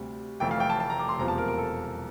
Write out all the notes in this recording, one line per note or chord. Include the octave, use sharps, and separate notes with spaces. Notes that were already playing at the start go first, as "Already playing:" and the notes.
Already playing: D2 C3 G3
F1 F2 E3 A3 G5
F5
G5
A5
A5
A#5
D6
C6
E1 E2 C3 F3 A3 A#5
A5
A#4
A#4
A4